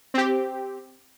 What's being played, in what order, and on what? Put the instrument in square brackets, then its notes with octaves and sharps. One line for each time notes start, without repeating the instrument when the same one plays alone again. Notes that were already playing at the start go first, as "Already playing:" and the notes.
[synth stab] C4 G4